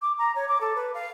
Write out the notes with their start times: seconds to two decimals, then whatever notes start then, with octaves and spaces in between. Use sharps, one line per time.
0.02 D6
0.18 A#5
0.35 C#5
0.48 D6
0.60 A4
0.75 B4
0.94 F5